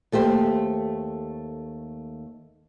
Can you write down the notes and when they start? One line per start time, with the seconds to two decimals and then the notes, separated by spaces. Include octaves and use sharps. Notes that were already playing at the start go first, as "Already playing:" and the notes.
0.12 D#2 A3 G4 C5